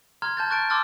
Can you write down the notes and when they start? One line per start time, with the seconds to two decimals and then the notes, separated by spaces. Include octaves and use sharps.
0.22 A#5 C6 F6 G#6
0.37 A5 G6 A6
0.50 C#6 F#6 A6 D7
0.70 A5 C6 D6 E6 F6 A6